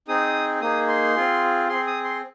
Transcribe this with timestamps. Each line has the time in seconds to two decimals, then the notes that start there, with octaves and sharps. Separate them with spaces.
0.08 C4 D#4 G#4 D#6
0.61 A#3 D#4 G#4 D#6
0.88 C6
1.16 C4 F4 G#4
1.69 C4 G#4 C6
1.87 D#6
2.04 C6